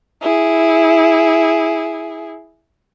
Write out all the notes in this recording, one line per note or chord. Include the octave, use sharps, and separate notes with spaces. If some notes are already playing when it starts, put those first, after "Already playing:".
E4 G#4